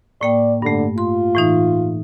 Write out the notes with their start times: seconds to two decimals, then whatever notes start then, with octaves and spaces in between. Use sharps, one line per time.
0.21 A2 A#3 D5 G5
0.62 G2 D3 A3
0.98 F4 C6
1.35 A2 E3 D#4